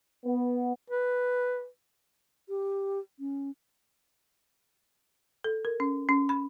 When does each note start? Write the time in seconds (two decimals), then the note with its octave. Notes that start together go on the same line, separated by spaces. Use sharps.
0.24 B3
0.90 B4
2.49 G4
3.19 C#4
5.44 A4
5.65 A#4
5.80 C#4
6.09 C#4
6.29 B5